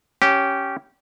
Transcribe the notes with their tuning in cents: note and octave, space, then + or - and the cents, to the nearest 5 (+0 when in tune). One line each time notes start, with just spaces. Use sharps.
C#4 +0 G4 -15